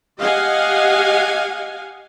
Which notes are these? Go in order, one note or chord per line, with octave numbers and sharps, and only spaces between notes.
G4 D#5 F5 F#5 G#5